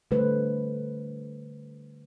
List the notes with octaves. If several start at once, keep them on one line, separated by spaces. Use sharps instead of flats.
D3 G3 A3 B4 C5